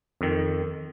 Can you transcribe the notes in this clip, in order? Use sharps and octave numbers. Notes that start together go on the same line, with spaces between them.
F2 D#3